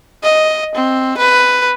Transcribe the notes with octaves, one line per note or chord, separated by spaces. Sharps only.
D#5
C4
B4